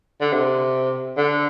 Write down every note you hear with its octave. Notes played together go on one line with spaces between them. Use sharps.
D3
C3
D3